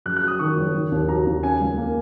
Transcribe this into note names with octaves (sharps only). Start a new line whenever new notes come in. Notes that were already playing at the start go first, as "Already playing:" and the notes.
F#2 F#6
F#6
F#3
D#6
D#3 C#6
F#1
D#3
D#2
F#3 A#5
D#2
C#3 G#5
C#2
A#3